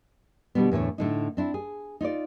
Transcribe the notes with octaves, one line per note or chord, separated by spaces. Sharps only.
B2 D3 G3 B3
E2 A2 D3 C#5
A2 D3 D#4
C4 D4 E4
G#4
D#4 F4 C#5 D5